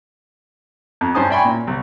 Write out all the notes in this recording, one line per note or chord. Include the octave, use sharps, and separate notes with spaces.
F2
G2 C#4 C5 A5 D#6
D5 E5 G5 G#5 B5 C#6
A#2 C#4
C2